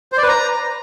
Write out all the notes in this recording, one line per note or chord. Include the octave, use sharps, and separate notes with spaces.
C5
D5
B4
A#5